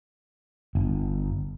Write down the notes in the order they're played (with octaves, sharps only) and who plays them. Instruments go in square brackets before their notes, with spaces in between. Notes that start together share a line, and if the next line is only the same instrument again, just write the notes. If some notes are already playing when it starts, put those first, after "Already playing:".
[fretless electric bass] G1